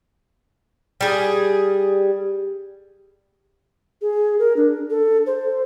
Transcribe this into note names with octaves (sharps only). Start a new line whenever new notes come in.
G3 G#4
G#4
A#4
D4
A4
C5